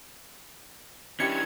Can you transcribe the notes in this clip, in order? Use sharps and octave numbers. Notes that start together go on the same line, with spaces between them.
E3 C#4 D4 E4 G4 G#6 C#7